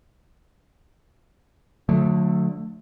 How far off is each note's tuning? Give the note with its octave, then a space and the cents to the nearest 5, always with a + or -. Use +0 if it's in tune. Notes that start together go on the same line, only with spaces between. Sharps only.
D3 +0 F#3 -40 A3 +0